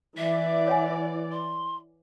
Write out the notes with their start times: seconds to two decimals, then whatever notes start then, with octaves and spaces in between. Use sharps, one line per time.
0.18 E3 D5 E5
0.68 C#5 F#5 G#5
1.32 C6